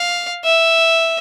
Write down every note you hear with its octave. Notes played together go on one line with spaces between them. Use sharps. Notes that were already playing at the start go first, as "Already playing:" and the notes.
Already playing: F5
E5